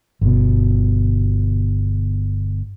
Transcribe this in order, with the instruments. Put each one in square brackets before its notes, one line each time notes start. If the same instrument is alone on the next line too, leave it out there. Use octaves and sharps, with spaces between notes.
[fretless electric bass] G1 B2